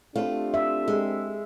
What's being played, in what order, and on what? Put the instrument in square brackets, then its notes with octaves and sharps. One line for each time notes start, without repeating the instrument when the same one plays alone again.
[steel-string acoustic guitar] A3 F4 [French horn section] C4 D4 G4
[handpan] E5
[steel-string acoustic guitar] G#3